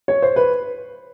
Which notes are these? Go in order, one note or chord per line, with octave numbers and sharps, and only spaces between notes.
C#5
C5
B4